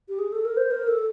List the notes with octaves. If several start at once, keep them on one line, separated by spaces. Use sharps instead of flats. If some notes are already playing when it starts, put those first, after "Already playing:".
G4
G#4
A4
A#4
C5
A#4
A4